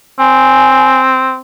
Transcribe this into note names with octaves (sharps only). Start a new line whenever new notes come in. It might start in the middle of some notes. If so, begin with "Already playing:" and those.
C4 G#5